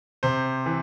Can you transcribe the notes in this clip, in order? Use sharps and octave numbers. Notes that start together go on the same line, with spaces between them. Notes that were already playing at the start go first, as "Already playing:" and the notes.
C3 C5
E3